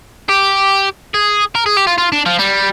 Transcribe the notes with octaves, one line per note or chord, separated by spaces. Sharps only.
G4
G#4
A#4
G#4
G4
F4
F4
D4
F3
G3